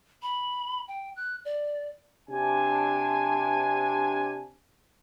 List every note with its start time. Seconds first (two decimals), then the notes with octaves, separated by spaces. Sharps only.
0.22 B5
0.88 G5
1.16 F#6
1.45 D5
2.29 C3 D4 G#5